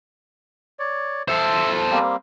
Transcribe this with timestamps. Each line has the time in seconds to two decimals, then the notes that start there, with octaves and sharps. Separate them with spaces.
0.79 C#5 D5
1.28 A4 C5 E5
1.91 G3 A#3 C4